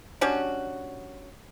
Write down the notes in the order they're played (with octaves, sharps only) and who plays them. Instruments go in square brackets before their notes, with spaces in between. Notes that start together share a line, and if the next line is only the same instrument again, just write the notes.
[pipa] G3 C#4 D4 F#4